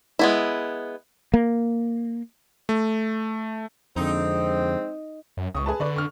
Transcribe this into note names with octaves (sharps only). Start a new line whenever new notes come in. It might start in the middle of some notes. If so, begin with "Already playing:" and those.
G#3 B3 E4
A#3
A3
F2 D3 G#3 C4 D#4
F#2
C#2 C#6 D#6
G#4 B4 A5
D3 B4 D5 C#6
C#6 F6